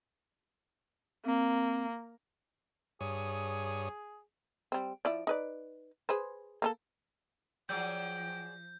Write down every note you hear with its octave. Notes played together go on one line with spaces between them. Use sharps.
A#3 C4
G2 G#4 C#5 D#6
G3 C4
F3 E4 D5
D#4 B4 D5
G#4 B4 C5
A#3 C4 A4
F3 F#3 G#4 D5 G5 G6